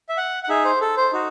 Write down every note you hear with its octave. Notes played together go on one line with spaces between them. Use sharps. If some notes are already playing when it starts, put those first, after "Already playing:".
E5
F#5
F#5
D#4 G#4 E5
C5
A4
C5
D#4 F#4